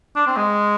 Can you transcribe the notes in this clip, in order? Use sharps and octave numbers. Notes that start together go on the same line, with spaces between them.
D4
C4
G#3